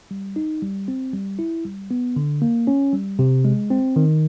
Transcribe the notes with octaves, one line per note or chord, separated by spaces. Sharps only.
G3
D#4
G3
C4
G3
E4
G3
B3
D3
A#3
C#4
G3
C3
G#3
C4
D#3